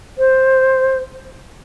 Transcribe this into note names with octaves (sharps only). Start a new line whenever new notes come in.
C5